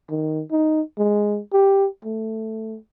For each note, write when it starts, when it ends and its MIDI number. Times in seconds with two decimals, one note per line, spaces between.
0.10 0.43 51
0.51 0.81 63
0.98 1.39 56
1.53 1.87 67
2.05 2.77 57